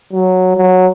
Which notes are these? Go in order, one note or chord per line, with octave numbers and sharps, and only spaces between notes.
F#3
F#3